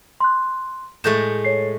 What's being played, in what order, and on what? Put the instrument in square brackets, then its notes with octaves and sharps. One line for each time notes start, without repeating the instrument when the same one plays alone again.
[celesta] C6 F#6
[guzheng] A2 G#3 A3 [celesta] A4 G6 E7
[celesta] C#5 C7